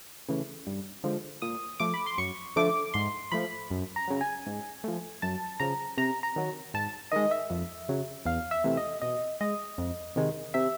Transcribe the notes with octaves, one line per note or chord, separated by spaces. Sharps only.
C#3 E3 A3
G2
D3 F3 G#3
A#2 D#6
F3 A3 D6
B5
C6
F#2 C#6
D3 F3 A3 D6
G#2 C6
F3 A3 B5
F#2
A#5
C#3 F#3
G#5
G#2
F3 A3
F#2 A5
C#3 F3 A#5
C3 A#5
A#5
D#3 F#3
G#2 A5
D#3 G#3 D#5
E5
F2
C#3 F#3
E2 F5
E5
C3 E3 A3
D#5
B2 D#5
G#3 D#5
F2
C3 D#3 G#3
C3 E5